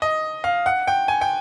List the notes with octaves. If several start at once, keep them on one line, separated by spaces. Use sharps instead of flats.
D#5
F5
F#5
G5
G#5
G5